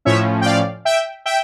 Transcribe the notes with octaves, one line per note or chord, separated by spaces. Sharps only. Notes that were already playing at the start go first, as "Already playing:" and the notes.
A2 F3 C#4 C#5 E5
G5
D5 F5
E5 G5
E5 G5